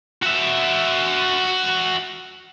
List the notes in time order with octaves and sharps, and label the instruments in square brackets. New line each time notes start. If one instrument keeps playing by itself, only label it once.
[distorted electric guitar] F#4 E5